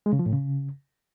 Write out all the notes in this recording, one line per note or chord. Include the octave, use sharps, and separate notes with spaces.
G#3
C#3
F3
A2
C#3